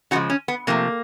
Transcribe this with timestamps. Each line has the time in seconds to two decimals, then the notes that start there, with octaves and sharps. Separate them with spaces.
0.11 C#3 F3 G#3 F#4
0.30 C#4
0.48 B3
0.67 C3 F3 A3 A#3